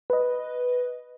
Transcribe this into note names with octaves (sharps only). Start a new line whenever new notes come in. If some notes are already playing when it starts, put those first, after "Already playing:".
B4 D#5